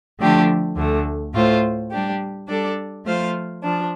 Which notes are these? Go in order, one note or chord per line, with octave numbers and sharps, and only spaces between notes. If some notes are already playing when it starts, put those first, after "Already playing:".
D3 F3 A3 D4 G4
D2 D3 A3
A2 A3 F4 C5
G3 D4 G4
G3 D4 A4 D5
F3 A3 F4 C5 F5
F3 D4